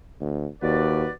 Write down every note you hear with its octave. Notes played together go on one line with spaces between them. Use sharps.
D2
D#2 F#4 B4 D5